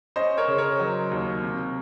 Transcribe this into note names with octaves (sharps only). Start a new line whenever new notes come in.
C#4 C5 D#5
A#4 C#5
C#3
A#4 C#5
F#3
D#2
C3